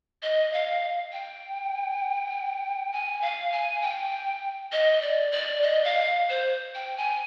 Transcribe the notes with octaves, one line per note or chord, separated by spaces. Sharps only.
D#5
F5
G5
G#5
F5
G#5
G5
D#5
D5
D5
D#5
F5
C5
G5
G#5